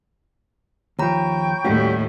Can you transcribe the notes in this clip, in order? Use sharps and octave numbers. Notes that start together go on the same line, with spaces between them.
D#2 F3 C#5 G5 A#5 B5 C#6 G6
D#2 A2 G3 C#4 F#4